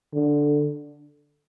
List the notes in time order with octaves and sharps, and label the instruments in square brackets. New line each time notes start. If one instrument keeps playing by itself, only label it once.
[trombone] D3